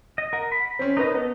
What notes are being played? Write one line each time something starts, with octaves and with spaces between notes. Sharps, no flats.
D#5
A#4 F#5
B5
C4 C#4
D#4 A#4 B4 C#5 D#5
B3 A4